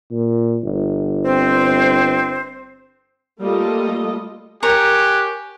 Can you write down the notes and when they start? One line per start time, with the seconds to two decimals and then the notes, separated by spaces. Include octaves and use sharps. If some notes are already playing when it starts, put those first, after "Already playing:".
0.11 A#2
0.63 G1
1.25 C4 C5
3.42 G3 A3 A#3 F4 A4 D#5
4.63 G4 A#4 C#5 G#5 F#6